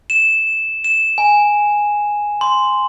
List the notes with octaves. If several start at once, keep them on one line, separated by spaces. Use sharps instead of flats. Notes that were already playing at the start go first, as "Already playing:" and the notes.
E7
E7
G#5
C6